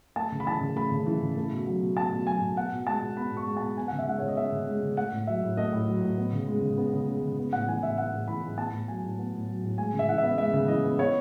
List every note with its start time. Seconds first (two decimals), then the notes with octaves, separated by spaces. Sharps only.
0.16 A3 A5
0.32 C#3
0.40 B5
0.47 E3 A5
0.61 C#3
0.76 A3 B5
0.92 C#3
1.06 E3
1.22 C#3
1.37 A3
1.52 B2
1.66 F#3
1.81 B2
1.97 A3 A5
2.12 B2
2.27 F#3 G#5
2.42 B2
2.57 B3 F#5
2.72 B2
2.87 G#3 A5
3.02 B2
3.17 B3 B5
3.32 B2 C#6
3.47 G#3
3.57 A5
3.62 B2
3.77 B3 G#5
3.88 C#3 F#5
3.99 E5
4.07 G#3 F#5
4.19 C#3 C#5
4.28 D#5
4.37 B3 E5
4.52 C#3
4.68 G#3
4.83 C#3
4.97 A3 F#5
5.12 A2
5.27 F#3 E5
5.42 A2
5.57 A3 D#5
5.72 A2
5.88 F#3
6.02 A2
6.17 B3
6.33 C#3
6.47 G#3
6.62 C#3
6.77 B3
6.93 C#3
7.08 G#3
7.23 C#3
7.38 B3
7.53 A2 F#5
7.68 E3 G#5
7.83 A2 E5
7.98 B3 F#5
8.13 A2
8.28 E3 B5
8.43 A2
8.58 B3 A5
8.74 A2
8.88 F#3 G#5
9.03 A2
9.19 B3
9.33 A2
9.49 F#3
9.63 A2
9.78 G#3 G#5
9.93 C#3
9.99 E5
10.09 E3 F#5
10.18 B3 E5
10.38 G#3 E5
10.53 C#3
10.68 E3 D#5
10.84 B3
10.99 B3 C#5